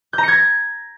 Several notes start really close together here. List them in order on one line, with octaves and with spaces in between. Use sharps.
G6 A#5 C#7 G#6 A#6